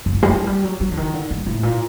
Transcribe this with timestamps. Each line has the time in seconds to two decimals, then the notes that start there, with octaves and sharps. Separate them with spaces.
0.06 F#2
0.14 G2
0.23 G3
0.30 F#3
0.47 G3
0.64 F#3
0.81 F#3
0.92 D3
0.97 D#3
1.13 D3
1.31 G2
1.47 A2
1.63 A#2